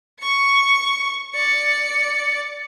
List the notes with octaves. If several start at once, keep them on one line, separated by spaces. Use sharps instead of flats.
C#6 C#7
D5 C#7